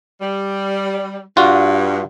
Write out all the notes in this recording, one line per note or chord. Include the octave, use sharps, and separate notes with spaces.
G3
G2 F4 F#4